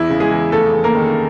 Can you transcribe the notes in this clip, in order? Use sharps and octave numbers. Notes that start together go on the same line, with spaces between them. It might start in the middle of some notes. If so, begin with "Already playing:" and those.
Already playing: E2 E4
C#3
G#3 G#4
E2
F1 A3 A4
E2
A#3 A#4
D#3